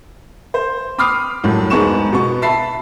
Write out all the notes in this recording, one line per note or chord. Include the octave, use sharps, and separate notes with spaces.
C5
B5 D6 D#6 F6 C7
C2 F#2 A2
E1 G#2 G#3 B3 C#6 E7
B2 B3 C#6
E5 A5 B5 C7